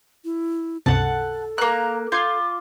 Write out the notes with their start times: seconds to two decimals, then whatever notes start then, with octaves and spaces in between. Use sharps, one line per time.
0.25 E4
0.86 C#2 G2 C3 A4 F#5 A5
1.58 A#3 A#5 F#6
2.12 F4 D6 G6 G#6 C7